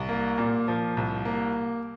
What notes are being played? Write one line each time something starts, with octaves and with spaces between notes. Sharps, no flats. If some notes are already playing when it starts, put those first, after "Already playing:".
Already playing: C2
A#3
A#2
F3
C2
A#3